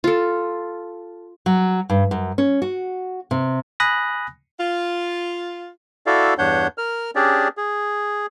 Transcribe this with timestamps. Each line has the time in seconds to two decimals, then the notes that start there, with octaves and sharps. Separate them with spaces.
0.04 F4 A4
1.46 F#3
1.89 G2
2.11 F#2
2.38 C#4
2.62 F#4
3.31 C3
3.80 G#5 B5 D#6 F#6 A#6
4.60 F4
6.06 E4 F#4 A4 D5 F5
6.38 E2 G2 D4 C#5 F#5 G6
6.78 A#4 F6
7.16 C#4 D4 G4 G#4 D5
7.57 G#4